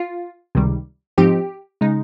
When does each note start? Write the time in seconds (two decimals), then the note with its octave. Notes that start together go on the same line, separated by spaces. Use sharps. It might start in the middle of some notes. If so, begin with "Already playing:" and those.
Already playing: F4
0.55 C#2 C3 D#3 G3
1.18 G#2 F3 C4 D#4 G4
1.81 C#3 G#3 D#4